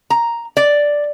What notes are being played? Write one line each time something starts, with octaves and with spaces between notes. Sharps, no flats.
A#5
D5